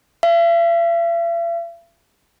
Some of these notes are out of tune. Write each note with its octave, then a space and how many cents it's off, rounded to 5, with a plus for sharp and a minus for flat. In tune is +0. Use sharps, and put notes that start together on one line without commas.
E5 +45